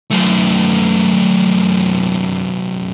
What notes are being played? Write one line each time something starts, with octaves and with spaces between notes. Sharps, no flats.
F#2 A3